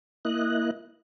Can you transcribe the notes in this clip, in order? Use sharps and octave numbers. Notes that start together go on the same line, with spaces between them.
A#3 E4 D#5 F#6